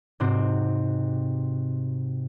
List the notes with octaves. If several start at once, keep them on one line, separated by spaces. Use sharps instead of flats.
G#2 C3 C4 F#4